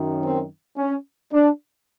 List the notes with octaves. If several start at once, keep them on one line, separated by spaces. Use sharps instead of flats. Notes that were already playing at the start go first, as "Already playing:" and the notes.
Already playing: F#2 D#3
C4
C#4
D4